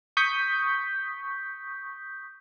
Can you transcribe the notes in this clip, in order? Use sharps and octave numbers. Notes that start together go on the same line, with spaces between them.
C#6 D#6 G6 B6